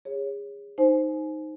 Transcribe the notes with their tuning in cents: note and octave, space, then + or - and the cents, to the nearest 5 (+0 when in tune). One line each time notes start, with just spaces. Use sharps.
G#4 -30 C#5 +0
D#4 +0 C5 +0 G#5 +30